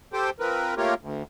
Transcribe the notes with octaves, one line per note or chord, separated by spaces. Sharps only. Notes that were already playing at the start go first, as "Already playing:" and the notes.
G4 A4 C5 G5
F3 C4 A#4 B4
A3 A#3 F4 G4 A#4 C#5
D2